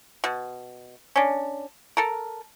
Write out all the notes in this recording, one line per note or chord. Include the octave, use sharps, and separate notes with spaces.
B2
C#4 D4
A4 A#4